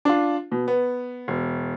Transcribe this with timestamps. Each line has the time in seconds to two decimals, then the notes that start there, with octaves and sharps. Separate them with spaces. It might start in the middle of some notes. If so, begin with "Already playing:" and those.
0.05 D4 F4
0.52 B2
0.68 B3
1.28 E1